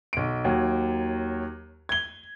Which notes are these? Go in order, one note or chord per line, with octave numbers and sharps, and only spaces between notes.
B1 D7
D#2 F#3
G#6 G7